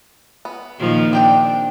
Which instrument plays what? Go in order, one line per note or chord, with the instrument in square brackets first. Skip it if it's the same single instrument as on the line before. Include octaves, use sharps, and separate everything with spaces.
[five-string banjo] B3
[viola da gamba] A#2 D#3 F3
[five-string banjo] C4 G4 G5 [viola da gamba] D4